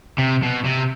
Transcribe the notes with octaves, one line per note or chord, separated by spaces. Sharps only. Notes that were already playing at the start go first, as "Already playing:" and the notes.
C3
B2
C3